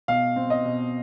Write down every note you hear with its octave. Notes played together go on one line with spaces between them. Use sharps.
B2 F5
C4
D#5
B2